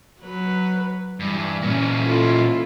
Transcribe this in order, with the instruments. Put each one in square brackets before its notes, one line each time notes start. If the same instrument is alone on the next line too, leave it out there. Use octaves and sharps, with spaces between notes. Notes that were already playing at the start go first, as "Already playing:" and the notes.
[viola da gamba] F#3 B4
[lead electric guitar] G2 [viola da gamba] E3
[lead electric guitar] A#2 C#4
[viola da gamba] E4 F4 A4